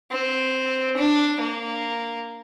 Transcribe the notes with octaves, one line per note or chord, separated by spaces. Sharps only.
C4
D4
A#3